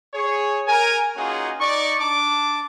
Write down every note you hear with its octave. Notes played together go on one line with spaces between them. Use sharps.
G#4 C#5
A#4 G#5
A#3 C#4 D#4 F4 F#4 G#4
D#4 D5 C#6
D4 A5 D6